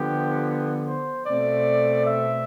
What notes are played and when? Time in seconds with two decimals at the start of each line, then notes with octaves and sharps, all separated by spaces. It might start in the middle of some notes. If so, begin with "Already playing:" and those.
Already playing: D3 F3 B3 G4
0.87 C5
1.26 B2 A3 C4 D5
2.04 E5